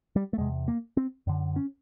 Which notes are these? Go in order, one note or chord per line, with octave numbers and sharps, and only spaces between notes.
G3
A3
E2 C3 G#3
A#3
C4
F#2 D3
C#4